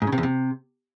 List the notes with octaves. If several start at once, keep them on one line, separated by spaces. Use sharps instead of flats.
G#2
C#3
C3
E2
C3